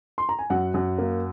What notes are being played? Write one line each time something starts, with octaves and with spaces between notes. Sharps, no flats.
C6
A#5
G#5
F#2 F#5
F#2
A#3